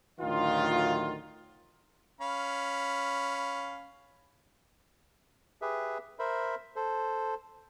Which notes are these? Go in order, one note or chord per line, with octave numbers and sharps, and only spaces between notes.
A1 D2 A2 D#3 F#3 F4
C#4 F5 B5
G4 G#4 B4 E5
A#4 C5 E5 B5
A4 C5